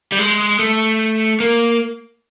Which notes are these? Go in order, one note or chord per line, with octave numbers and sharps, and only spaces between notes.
G3
G#3
A3
A#3